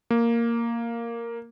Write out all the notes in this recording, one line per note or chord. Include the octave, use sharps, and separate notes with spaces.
A#3